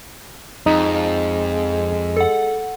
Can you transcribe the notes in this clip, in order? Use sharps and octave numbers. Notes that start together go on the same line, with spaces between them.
F2 G#3 D#4
A4 F#5